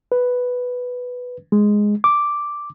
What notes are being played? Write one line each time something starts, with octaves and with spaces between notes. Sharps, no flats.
B4
G#3
D6